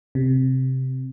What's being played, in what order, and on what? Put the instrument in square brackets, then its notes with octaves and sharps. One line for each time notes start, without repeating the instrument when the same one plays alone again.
[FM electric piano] C3